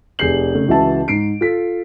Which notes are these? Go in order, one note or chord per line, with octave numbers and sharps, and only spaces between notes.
F1 G#4 G6 C7 F#7
C#3 A3
C#2 E3 F#4 E5 A5
G#2 C7 D7
F4 A4 B6